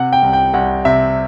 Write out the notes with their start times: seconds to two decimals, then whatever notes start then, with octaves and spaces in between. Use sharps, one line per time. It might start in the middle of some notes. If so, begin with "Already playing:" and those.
Already playing: C3 F#5
0.13 G5
0.22 C2
0.33 G5
0.54 C2 F#5
0.85 C3 E5